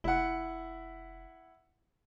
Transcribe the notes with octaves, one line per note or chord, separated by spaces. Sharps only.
F1 E4 F#5